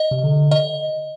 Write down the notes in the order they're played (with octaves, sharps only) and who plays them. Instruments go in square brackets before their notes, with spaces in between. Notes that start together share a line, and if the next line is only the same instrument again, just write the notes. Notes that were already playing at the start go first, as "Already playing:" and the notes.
Already playing: [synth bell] D#5
[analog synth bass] C3
D3
[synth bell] D#5